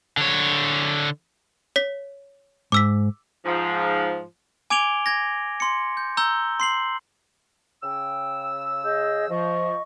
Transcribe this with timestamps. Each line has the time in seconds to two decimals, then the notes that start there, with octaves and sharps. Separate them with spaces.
0.17 D3 C#5
1.76 C#5 B6
2.72 G#2 D6 E6 B6
3.46 G#2 F3
4.70 G#5 D6 G#6 D7 F7 G7
5.06 G#6 A#6
5.60 C6 C#7
5.97 G6
6.17 A#5 E6 G6 G7
6.60 C6 C7 F#7
7.83 C#3 G5 E6
8.84 G#4 D#5 G6
9.30 F3 D#5 C#6